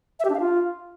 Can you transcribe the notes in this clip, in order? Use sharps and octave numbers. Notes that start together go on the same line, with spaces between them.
E5
G4
D4
F5
F4